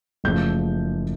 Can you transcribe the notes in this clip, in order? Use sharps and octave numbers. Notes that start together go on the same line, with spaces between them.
F#1 F#2 C#3 F3 A3 G6